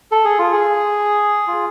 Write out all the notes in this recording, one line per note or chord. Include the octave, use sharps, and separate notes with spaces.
A4
G#4
F4
G#4
F4